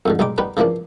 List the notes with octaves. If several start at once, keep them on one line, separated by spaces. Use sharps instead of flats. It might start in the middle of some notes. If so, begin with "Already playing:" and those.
F2 G#2 D3
B1 G3 G#3 D#4 D6
G3 B3 D#4 B4
C#3 E3 F3 A#3 D4